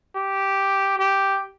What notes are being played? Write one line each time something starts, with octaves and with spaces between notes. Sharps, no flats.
G4
G4